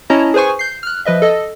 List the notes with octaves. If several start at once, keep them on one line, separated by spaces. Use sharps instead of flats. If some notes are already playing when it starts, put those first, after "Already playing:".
C#4 E4 C#5 D#5 A5 A#5
G#4 B4 C5 G#5 C#6
G6 C7
F6 F#6
F3 B4 D#5 E5
A4 D#5